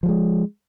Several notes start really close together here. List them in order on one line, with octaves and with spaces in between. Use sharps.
F3 G3 G#3